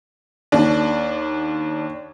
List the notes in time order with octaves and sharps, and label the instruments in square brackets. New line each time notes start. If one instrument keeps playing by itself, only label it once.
[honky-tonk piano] D#2 D4